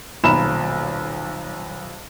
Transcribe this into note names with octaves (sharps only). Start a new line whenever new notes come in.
D#1 B1 A#5 B5 E7